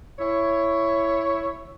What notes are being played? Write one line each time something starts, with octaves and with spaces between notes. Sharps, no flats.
E4 C#5